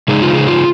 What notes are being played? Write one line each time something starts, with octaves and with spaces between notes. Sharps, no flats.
C#3 G#3 D#4 G#4
F4
G#4
F4